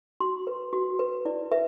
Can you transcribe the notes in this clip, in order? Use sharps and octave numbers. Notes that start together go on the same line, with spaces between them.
F#4 C6
B4
F#4
B4
E4 D5
B4 E5